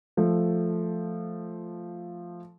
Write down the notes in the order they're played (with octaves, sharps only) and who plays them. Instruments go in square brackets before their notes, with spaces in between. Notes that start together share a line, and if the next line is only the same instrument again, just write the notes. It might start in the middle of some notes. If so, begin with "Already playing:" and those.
[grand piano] F3 A3